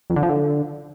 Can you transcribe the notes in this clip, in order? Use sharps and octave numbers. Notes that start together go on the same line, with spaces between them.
F2
D3
F3
D3